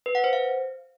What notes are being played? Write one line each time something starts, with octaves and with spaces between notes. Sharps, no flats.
B4
F#5
C5
F5